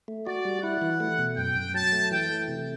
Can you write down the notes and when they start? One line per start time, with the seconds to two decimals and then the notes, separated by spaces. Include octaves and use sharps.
0.08 A3
0.27 F#4 D5
0.45 G3
0.63 E4 F#5
0.82 E3
1.00 A3
1.19 B2
1.37 F#2 G5
1.55 F#2
1.74 F#3 A5
1.92 A3
2.11 E3 G5
2.30 A3
2.48 C3